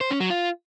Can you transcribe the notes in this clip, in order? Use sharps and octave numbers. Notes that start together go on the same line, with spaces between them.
C5
C#4
F#3
F4